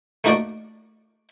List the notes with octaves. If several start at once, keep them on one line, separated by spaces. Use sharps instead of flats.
A3 A#3 D#4 F#4 A#4 D5